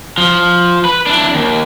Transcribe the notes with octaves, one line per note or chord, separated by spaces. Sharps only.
F3
B4
D4 E4
D#2